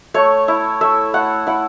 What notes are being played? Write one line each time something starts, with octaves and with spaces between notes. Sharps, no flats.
A3 C#5
E4
A3 E5
A3 F#5
E4 F#5